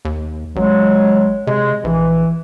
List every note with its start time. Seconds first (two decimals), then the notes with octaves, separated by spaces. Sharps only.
0.05 D#2
0.56 A1 F#3 G#3
1.47 C3 G#3
1.84 A#1 E3